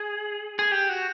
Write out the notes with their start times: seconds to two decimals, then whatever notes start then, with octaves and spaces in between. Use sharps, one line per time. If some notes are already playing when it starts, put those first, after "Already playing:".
Already playing: G#4
0.59 G#4
0.71 G4
0.89 F#4